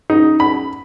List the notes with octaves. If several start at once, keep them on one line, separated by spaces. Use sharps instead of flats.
D#4
B5